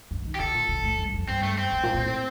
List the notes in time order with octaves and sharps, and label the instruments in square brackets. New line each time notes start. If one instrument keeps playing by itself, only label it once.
[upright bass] G2
D#3
[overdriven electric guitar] G4
[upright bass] D3 [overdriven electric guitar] A4
[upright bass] A#2
C3
A2
G2
F2
[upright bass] G2 [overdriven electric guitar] C4
[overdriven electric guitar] A3
C4
[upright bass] G2
A#2
A#2
A2